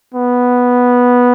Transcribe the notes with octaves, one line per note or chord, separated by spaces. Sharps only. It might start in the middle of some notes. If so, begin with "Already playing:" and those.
B3